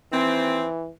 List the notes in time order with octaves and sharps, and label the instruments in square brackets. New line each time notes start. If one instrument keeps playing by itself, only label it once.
[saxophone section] D#2 C4 [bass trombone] E3